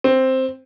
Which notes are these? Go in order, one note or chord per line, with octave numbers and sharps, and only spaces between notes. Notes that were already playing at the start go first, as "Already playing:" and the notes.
C4